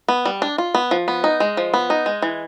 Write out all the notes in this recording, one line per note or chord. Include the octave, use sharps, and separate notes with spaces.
B3
G3
D4
F4
B3
F3
B3
D#4
G#3
F3
B3
D#4
G#3
E3